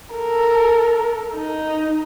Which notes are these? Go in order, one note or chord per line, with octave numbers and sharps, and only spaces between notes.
A4 A#4
D#4